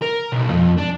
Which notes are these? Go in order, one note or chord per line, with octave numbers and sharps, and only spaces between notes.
A#4
B1
F2
D4